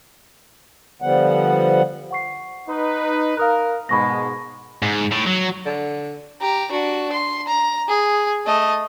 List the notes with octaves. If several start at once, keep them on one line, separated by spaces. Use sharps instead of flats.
D3 F3 G3 B3 F#5
F#5 C#6 C7
D#4 B4
A#4 F5 D#6 F#6
G#2 B2 G#3 B5 C#6 A#6
G#2
A2
F#3
D3
G4 A#5
D4 F#4
C6
A#5
G#4
A3 D#5